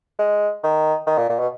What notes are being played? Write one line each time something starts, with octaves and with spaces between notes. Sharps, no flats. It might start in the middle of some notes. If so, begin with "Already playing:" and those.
G#3
D#3
D#3
A#2
A#2
B2